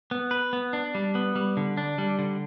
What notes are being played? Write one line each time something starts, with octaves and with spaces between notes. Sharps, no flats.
B3
B4
B3
D4
G3
B3
G3
D3
D4
G3
D3